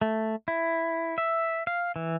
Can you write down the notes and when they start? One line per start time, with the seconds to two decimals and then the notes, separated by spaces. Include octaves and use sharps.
0.02 A3
0.48 E4
1.18 E5
1.67 F5
1.96 E3